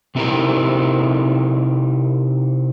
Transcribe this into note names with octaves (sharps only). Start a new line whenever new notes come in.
C3 C4 D#4 E4 A#4 A#5